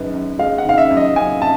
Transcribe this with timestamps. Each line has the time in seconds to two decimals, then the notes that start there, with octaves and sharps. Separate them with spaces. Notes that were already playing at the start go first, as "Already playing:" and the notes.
Already playing: F#2 D#3 G#3 B4
0.13 F#2
0.39 G#3 F5
0.58 F#5
0.65 D#3 F5
0.78 E5
0.91 F#2
0.97 D#5
1.16 F#2 G#5
1.42 A5